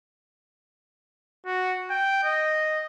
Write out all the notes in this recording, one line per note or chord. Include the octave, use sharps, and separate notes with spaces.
F#4
G5
D#5